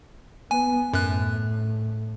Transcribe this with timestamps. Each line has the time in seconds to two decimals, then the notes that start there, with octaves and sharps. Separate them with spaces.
0.51 B3 G#5
0.93 F#2 A2 F#6